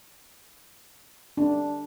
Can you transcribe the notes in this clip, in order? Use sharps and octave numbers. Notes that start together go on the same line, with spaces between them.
D4